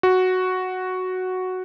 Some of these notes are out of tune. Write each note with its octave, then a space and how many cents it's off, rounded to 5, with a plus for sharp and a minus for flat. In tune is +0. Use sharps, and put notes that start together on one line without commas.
F#4 +0